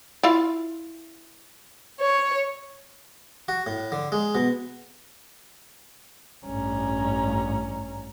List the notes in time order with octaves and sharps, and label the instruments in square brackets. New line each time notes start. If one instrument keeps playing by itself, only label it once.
[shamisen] E4 F4 F5
[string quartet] C#5
[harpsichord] F#4
A2
D3
G#3
B2
[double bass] A1 G2 [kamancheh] C#4 A#5